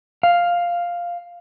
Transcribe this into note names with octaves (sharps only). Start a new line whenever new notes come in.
F5